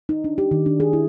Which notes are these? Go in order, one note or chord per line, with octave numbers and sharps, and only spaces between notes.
D#4
D4
G4
D#3
D4
G#4
E4